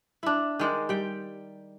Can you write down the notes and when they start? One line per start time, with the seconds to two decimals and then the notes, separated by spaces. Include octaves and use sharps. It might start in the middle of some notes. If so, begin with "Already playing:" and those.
0.23 D4 E4
0.60 D#3 G#3 D5
0.89 G3 G5